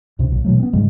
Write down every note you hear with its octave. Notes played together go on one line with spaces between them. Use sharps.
D2 C3
B1 A#2
B2 E3 F#3 A3
B3 C4
G#2 C#3 G3 G#3